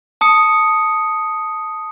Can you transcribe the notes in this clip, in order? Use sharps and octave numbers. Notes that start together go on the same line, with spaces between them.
A5 D#6 C#7